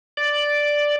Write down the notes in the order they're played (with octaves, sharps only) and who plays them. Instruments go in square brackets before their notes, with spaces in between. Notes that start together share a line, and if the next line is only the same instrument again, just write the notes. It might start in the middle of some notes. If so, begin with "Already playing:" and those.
[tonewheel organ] D5